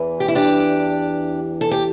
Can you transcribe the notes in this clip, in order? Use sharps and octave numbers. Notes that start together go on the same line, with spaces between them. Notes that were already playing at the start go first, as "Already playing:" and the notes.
Already playing: E2 E3
G4
E4
D4 G4
A4
G4